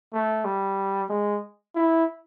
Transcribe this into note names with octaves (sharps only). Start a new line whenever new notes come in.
A3
G3
G#3
E4